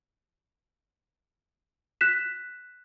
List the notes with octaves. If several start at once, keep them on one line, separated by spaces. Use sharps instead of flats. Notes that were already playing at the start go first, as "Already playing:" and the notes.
F#6 B6 E7